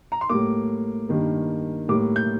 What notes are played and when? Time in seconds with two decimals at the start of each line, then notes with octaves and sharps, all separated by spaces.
0.12 A#5
0.21 C6
0.29 A2 G3 A#3 D6
1.09 G2 D#3 A#3
1.88 A2 G3 A#3 D6
2.16 G6